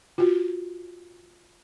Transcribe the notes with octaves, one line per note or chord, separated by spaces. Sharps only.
F4 F#4